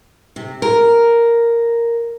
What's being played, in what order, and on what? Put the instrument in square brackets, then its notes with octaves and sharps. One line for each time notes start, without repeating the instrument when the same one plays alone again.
[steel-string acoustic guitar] C3
A#4